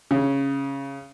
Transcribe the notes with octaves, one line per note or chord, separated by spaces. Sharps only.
C#3